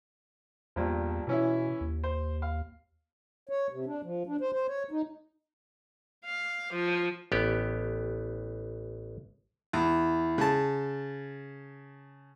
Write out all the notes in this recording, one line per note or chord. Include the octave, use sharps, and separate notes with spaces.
E2 G2 A#2 F3
B2 E3 C#4 E4
D#2
C5
F5
C#5
C3
D4
F3
D4
C5
C5
C#5
D#4
F5
F3
A1 B3 G4
E2
C#3 A5